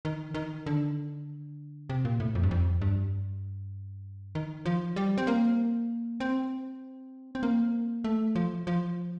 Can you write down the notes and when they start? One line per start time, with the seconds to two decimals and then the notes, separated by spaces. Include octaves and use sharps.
0.05 D#3
0.34 D#3
0.66 D3
1.90 C3
2.05 A#2
2.20 A2
2.35 F2
2.43 G2
2.51 F2
2.82 G2
4.35 D#3
4.65 F3
4.96 G3
5.18 C4
5.27 A#3
6.20 C4
7.35 C4
7.43 A#3
8.04 A3
8.36 F3
8.67 F3